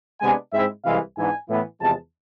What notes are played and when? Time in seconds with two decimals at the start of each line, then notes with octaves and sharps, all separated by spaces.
0.21 C3 G#3 B3 D4 G#5
0.53 G#2 G#3 C4 E4 E5
0.85 C2 C3 E3 G#3 F5
1.16 G#2 E3 B3 D4 G#5
1.48 A2 E3 B3 E4
1.80 E2 C3 F3 G#3 A5